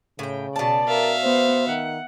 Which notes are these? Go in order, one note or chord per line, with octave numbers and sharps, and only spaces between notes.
A2 C#3 G5
B2 D5 A5
A#4 E5 F5
B3 C5
D#3 F#5